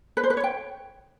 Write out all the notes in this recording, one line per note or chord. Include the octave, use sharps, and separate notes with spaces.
B4
C5
B4
C#5
G5